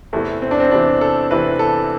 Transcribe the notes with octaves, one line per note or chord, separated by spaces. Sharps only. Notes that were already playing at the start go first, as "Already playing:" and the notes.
E2 C3 E3 A3
C4
D4
C4
E2 C3 E3 D4
A4
E2 C3 E3 B4
A4